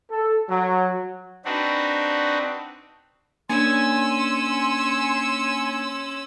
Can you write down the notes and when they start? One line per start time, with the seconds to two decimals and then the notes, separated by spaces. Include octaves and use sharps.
0.10 A4
0.49 F#3
1.45 C4 D4 D#4 F#4 B4
3.49 A#3 C#4 D4 G#5 C6 E6